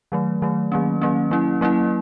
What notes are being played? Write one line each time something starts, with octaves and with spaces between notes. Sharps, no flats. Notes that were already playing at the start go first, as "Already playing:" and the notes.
D#3 F#3 A3
D#3 F#3 A3
D#3 F#3 A#3 C#4
D#3 F#3 A#3 C#4
F#3 A#3 C#4 E4
F#3 A#3 C#4 E4